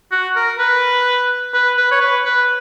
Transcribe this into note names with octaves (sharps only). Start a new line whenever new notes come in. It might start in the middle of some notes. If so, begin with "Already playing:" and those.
F#4
A#4
B4
B4
B4
C#5
B4
B4